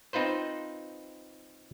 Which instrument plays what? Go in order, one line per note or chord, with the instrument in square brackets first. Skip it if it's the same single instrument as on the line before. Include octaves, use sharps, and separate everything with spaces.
[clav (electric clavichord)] C4 D#4 F4 B4 C5